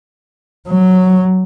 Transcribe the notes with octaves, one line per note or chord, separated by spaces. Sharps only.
F#3